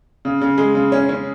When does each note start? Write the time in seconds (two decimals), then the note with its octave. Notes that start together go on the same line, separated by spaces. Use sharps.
0.25 C#3
0.41 C#3
0.58 G#3
0.75 C#3
0.92 C#4
1.09 C#4